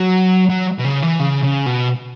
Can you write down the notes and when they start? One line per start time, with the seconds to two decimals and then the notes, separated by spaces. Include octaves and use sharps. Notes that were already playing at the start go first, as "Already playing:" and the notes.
Already playing: F#3
0.50 F#3
0.79 B2
0.84 C#3
1.02 E3
1.19 C#3
1.42 C#3
1.66 B2